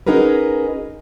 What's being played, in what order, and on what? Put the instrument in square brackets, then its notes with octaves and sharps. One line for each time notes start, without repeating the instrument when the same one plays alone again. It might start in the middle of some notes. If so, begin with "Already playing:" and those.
[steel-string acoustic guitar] C#4 D#4 F#4 G#4 A#4 B4